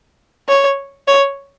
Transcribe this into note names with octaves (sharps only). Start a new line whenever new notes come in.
C#5
C#5